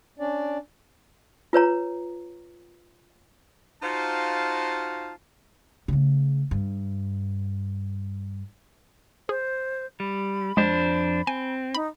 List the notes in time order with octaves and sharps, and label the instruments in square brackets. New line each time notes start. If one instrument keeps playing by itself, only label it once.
[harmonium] C#4 D4 D5
[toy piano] F4 B4 C#5 A#5
[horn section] D#4 F4 F#4 C5 F5 A5
[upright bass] C#3 A3
G2
[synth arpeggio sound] G#4 [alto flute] C5
[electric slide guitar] G3 [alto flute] B5
[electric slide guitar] F2 D4 C5 [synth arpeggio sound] G#3 G4
[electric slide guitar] C4 [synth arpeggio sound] G#5
[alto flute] D#4 [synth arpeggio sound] B5